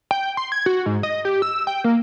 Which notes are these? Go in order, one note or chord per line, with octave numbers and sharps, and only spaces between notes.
G5
C6
G#6
F#4
G#2
D#5
G4
E6
G5
A#3